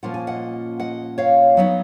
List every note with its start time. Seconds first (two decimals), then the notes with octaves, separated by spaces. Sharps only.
0.03 A#2 F3 A#3 C#4 F4 F#5
0.14 G#5
0.27 D#5 F#5
0.80 D#5 F#5
1.18 C#5 F5
1.57 F#3 B3 D#4